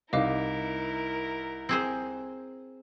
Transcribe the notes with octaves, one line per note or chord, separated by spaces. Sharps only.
C2 D#4 E4 A#4 D#5 F5 D6
C4 G#4 C5